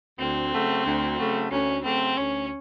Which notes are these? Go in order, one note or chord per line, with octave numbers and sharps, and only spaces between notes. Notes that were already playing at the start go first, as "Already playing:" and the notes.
D2 C4
C#3 F#3 A3
D2
C#3 F#3 A3
D2 C#4
C#3 F#3 A3 C4
D2 C#4